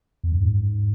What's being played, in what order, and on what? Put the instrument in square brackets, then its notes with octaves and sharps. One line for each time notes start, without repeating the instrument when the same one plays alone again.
[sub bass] E2
F#2
G#2